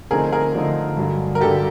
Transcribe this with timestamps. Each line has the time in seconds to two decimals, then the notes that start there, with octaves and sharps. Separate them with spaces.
0.10 D3 F3 A3 C4 D#4 G#4 A#4
0.32 G#4 A#4
0.55 D3 F3 A3 C4 D#4
0.97 G2 D3 F#3
1.35 A#4
1.41 G2 D3 F#3 G4 A4